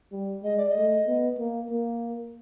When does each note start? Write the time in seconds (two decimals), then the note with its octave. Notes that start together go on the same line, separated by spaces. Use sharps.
0.12 G3
0.43 G#3 D#5
0.57 D5
0.69 D#5
0.76 A3
1.07 B3
1.39 A#3
1.71 A#3